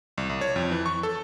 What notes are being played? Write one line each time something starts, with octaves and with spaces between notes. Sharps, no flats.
C2
C2
C#5
F2
E3
C#6
A4